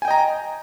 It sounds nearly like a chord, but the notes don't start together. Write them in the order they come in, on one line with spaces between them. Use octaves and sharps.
G#5 G5 D#5 A#5